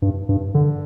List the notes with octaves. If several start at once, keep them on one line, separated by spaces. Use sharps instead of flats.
G2
G2
D3